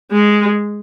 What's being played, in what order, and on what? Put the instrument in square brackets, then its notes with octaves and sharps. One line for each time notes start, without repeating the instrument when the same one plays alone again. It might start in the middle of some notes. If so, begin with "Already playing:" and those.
[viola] G#3